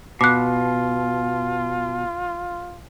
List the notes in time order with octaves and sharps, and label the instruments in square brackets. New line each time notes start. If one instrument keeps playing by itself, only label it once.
[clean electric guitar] B2 [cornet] F4 [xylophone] D6 F#6